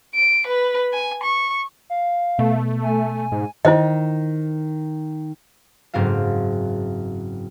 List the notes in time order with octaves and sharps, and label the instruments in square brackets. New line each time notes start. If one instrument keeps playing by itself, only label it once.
[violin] D7
B4
G#5
C#6
[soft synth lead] F5
[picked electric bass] B2 [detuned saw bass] A3
[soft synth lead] G#5
[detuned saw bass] G#2
[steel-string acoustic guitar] D#3 [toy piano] E4 C5 D#5
[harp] F#1 G#2 C4 F#4 F5